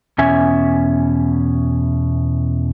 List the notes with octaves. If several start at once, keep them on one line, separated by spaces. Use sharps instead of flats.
E2 B2 C#4 E5 G#5